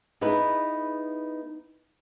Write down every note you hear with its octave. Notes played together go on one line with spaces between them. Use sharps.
B3 D#4 E4 G#4 B4